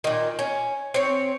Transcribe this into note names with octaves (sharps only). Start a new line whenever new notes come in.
A#2 D#3
C#4
C4 C#5